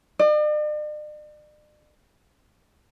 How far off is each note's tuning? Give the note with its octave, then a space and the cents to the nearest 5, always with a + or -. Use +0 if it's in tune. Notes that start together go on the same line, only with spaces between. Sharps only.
D5 +45